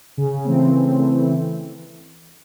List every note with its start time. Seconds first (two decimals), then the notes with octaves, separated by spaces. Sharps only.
0.17 C#3
0.45 E3 A3 C4
0.71 C#3
0.98 E3 A3 C4
1.25 E3